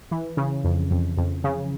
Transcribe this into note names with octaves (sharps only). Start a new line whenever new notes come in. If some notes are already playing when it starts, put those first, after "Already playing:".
E3
C#3
F2
F2
F2
C#3